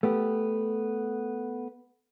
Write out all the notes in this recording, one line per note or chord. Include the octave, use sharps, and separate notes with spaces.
A3 B3 G4